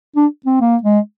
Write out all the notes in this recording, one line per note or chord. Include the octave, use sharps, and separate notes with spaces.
D4
C4
A#3
G#3